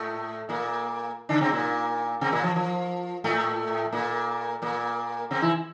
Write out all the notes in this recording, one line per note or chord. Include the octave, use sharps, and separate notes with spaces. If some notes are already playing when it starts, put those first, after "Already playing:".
Already playing: A2 A3
A#2 A#3
D3 D4
C3 C4
A#2 A#3
C3 C4
A#2 A#3
F3
F3
A2 A3
A#2 A#3
A#2 A#3
C3 C4
E3 E4